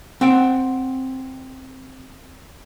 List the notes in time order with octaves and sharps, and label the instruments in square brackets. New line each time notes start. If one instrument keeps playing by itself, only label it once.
[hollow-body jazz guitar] C4 F#5 G5